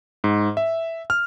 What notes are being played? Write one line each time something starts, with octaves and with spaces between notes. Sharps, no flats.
G#2
E5
F6